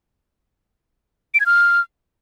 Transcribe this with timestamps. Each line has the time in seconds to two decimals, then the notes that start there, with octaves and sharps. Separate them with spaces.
1.34 D7
1.40 G#6
1.46 F6